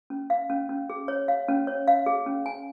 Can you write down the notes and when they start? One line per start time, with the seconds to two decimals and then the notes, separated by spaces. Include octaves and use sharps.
0.10 C#4
0.30 F5
0.50 C#4
0.69 C#4
0.90 G#4
1.08 C#5
1.28 F5
1.48 C#4
1.67 C#5
1.88 F5
2.06 G#4
2.26 C#4
2.46 G#5